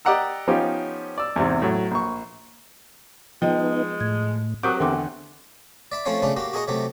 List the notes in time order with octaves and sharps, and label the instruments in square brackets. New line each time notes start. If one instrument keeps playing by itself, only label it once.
[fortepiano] G4 D5 D#5 F#5 A#5 E6
F3 B3 C#4 D#4 F4 G4
D5 E6
E2 G#2 C3
A2 F#3
A#1 C#6
[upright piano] F3 [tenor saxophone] G#3 [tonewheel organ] B3 D#4 [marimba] D#5 G5
[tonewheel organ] A2 [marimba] G#6
[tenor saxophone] F#3 [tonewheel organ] C4 G4 A#4 [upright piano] D6 F#6 [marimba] D#6 G6
[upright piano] E2 D3 [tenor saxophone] A3 [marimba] G5 C6 D6
[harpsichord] D5 E5 B5
F3 A3 C4 C#4 C#5 F5
C#3 A3 C#4 D4 F4
A#3 F#4 G4
F#4 G#4 A#4 D#5 C#6
C3 F#3 A3 G4